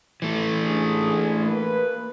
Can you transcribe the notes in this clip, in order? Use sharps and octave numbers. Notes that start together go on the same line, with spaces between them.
E3 A3
C#2 D4 G#4
A#3 B4